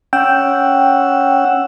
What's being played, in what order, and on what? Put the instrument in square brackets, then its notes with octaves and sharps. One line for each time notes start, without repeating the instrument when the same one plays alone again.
[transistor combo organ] C#4 F#5 E6 [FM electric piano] G5